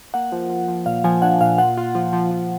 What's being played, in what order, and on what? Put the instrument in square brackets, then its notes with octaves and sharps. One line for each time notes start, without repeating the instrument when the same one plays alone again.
[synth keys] A#3 [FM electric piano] F#5
[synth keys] F3
F3
F3
[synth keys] A#2 [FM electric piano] F5
[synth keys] F3 [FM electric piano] G#5
[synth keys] D4 [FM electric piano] F#5
[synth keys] A#2 [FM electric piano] F5
[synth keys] F4 [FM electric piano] F#5
[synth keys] F4
F3
F3
F3